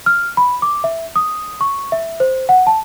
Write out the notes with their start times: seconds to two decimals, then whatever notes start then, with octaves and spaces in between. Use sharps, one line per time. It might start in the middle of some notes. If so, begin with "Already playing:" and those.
0.06 F6
0.37 B5
0.62 D6
0.84 E5
1.16 D#6
1.61 C#6
1.92 E5
2.20 C5
2.49 F#5
2.67 A5